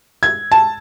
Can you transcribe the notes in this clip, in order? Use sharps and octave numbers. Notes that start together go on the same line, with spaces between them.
G#6
A5